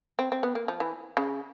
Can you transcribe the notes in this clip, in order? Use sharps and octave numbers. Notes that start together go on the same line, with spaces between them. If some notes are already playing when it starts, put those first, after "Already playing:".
C4
C4
B3
A#3
F3
E3
C#3